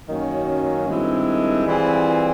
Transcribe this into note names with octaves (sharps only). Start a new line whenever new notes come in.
F#2 D#3 F#3 A#3 C#4
G2 D#3 G#3 C4 E4
E3 G3 C4 F4 G#4